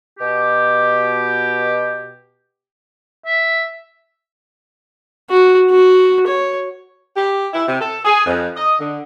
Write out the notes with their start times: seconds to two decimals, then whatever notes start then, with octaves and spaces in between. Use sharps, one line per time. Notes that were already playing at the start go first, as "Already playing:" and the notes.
0.19 B2 G4
3.26 E5
5.30 F#4
5.70 F#4
6.27 C#5
7.16 G4
7.53 E4
7.67 C3
7.80 A4
8.04 G#4
8.26 F2
8.56 D#5
8.80 D3